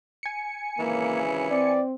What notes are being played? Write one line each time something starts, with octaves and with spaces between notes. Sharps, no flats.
G#5 C#7
G#1 C#3 E3 A#3
C4 D5